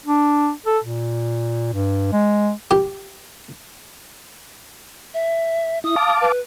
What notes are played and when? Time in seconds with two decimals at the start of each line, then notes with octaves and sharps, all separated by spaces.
0.06 D4
0.66 A4
0.84 A#2
1.73 G2
2.13 G#3
2.71 G4
5.14 E5
5.84 E4 D#6
5.96 F5 A5 D6
6.21 B4